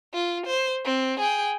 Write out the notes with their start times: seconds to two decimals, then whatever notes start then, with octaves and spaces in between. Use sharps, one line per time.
0.14 F4
0.46 C5
0.86 C4
1.20 G#4 G5